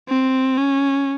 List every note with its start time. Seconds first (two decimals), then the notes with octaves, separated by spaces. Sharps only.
0.09 C4
0.57 C#4